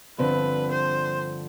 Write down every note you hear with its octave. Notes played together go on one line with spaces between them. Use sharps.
G2 D3 F3 C4 B4
C5